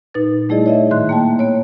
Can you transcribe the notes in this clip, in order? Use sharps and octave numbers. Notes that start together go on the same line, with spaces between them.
A#2 D#4 B4 A6
G3 A3 E4 G#4 D5 D#5
C#5 D#5 E5
A2 D#3 C6 F#6
A#3 G5 A5
B3 C#5